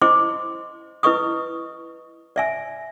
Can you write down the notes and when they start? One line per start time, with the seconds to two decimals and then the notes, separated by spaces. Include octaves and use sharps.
0.02 E4 C5 D#5 C6 D6
1.03 E4 B4 D#5 C#6 D#6
2.36 D5 E5 G#5